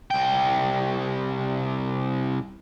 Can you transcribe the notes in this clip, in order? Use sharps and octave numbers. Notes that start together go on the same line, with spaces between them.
C2 G5